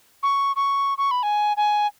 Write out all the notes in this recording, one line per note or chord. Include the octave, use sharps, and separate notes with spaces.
C#6
C#6
C#6
B5
G#5
G#5